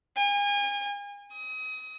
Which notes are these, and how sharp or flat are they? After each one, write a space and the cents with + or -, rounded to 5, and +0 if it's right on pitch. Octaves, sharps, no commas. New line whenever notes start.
G#5 -35
D#6 +30